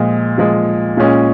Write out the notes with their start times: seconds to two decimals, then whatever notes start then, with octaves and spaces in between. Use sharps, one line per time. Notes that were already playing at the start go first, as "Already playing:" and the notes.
Already playing: A#2 F3 G#3
0.38 A#2 F3 G#3
0.97 A#2 G#3 C#4